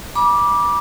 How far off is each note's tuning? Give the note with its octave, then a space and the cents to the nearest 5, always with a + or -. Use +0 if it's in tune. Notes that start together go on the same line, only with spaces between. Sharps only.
B5 -35 D6 +0